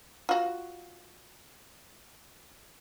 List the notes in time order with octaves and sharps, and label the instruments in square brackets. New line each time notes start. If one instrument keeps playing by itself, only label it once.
[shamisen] F4 F#4